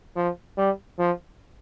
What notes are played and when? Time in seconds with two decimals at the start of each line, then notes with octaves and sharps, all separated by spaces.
0.16 F3
0.57 G3
0.99 F3